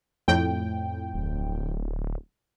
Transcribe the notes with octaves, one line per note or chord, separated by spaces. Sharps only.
F2 A2 G5
D1